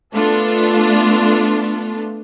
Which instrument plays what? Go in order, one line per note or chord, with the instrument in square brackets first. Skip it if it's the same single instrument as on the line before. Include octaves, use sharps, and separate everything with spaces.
[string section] A3 B3 D4 F4 A4